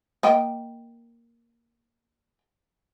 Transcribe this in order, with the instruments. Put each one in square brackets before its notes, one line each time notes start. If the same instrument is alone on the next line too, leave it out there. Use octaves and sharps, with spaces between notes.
[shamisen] A#3 D#5 G5